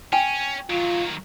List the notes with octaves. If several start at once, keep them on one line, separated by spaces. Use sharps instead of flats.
C#4 G5 G#5
D#3 F#3 F4